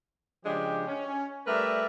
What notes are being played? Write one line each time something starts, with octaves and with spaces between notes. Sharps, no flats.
C#3 F3 G#3 D4 G4
C#4
G3 A3 A#4 B4 D5 E5